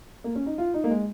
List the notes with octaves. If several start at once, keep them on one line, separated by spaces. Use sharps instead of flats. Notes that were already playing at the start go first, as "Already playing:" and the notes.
A#3
C#4
D#4
F4
D#4
A#3
G#3